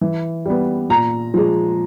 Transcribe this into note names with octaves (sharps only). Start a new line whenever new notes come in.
E3
G3 B3
A#2 A#5
F3 G#3